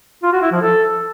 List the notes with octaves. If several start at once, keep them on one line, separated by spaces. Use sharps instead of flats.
F4
F#4
E4
F3
A4